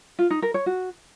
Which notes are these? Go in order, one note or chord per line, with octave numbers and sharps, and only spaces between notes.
F4
D#4
A#4
C#5
F#4